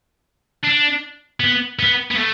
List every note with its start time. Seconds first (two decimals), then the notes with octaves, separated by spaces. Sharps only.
0.64 D4
1.40 B3
1.79 B3
2.11 B3
2.16 A3